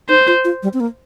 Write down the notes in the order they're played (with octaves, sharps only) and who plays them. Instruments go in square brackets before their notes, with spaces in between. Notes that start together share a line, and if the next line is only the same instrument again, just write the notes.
[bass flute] D#4 [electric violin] C5
[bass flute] F4
F4
G3
C4
A#3